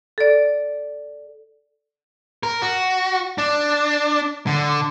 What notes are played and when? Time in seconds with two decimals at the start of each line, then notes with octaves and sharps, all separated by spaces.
0.18 A4 D5
2.43 A#4
2.62 F#4
3.38 D4
4.47 D3